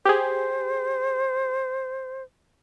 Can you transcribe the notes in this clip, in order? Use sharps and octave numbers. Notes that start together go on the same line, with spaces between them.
G4 G#4 C5